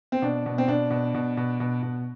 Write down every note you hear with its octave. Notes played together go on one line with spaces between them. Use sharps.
C4
B2 D4
B2
C4
B2 D4
B2
B2
B2
B2
B2